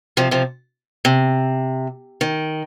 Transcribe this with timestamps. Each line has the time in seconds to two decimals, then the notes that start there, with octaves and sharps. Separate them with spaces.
0.17 C3 F3
0.31 C3 F3
1.05 C3
2.21 D#3